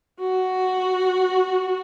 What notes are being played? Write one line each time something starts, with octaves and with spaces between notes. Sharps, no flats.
F#4